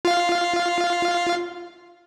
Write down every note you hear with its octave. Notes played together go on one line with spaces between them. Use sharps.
F4 F5